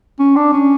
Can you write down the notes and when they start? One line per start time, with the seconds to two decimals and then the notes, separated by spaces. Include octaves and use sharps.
0.20 C#4
0.36 D4
0.53 C#4